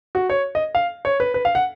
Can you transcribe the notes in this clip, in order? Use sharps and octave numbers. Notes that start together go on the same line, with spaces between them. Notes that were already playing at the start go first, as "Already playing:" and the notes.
F#4
C#5
D#5
F5
C#5
B4
B4
F5
F#5